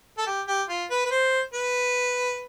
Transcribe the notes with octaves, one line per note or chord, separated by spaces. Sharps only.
A4
G4
G4
F4
B4
B4
C5
B4